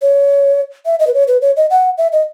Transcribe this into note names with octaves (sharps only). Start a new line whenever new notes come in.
C#5
E5
D#5
B4
C#5
B4
C#5
D#5
F#5
E5
D#5